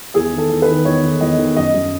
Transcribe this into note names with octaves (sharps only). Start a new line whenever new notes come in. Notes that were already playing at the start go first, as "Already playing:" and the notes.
E2 G#4
D#3
A4
E2
B4
D#3
E2 C#5
D#3
E2 D#5
D#3
F#2 D#5
F#2